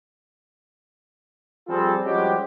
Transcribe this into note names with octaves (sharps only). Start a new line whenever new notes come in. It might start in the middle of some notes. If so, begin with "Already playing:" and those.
F3 G3 C4 F4 G#4 A4
F3 G3 G#3 C#4 F#4 G4